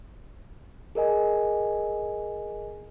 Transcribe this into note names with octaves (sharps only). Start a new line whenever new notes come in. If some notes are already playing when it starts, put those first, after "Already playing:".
G#4 A#4 D#5 G#5